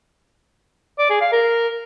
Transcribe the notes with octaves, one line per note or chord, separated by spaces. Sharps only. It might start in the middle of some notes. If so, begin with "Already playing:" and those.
D5
G#4
F5
A#4